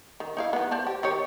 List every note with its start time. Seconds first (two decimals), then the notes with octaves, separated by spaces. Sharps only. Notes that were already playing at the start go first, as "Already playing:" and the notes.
0.20 D#3
0.37 D#4 E4 F5
0.53 E3 B3
0.71 C5 D5 A5
0.87 G4
1.03 D#3 G4 C#5